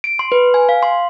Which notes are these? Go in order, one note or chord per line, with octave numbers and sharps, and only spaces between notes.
D7
C6
B4
G#5
F5
C6